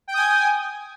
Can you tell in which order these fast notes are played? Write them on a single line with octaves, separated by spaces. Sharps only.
G5 G6 D#6 G#5